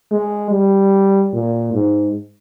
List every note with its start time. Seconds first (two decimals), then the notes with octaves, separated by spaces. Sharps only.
0.11 G#3
0.51 G3
1.33 A#2
1.73 G#2